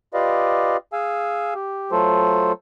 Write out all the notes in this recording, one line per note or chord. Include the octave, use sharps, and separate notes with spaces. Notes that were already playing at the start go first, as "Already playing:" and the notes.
F4 G4 B4 D5 D#5 F5
G#4 F5 G#5 E6
G4
F#3 A3 F4 A4 C5